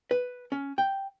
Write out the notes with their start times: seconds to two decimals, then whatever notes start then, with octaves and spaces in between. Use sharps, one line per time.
0.11 B4
0.52 C#4
0.78 G5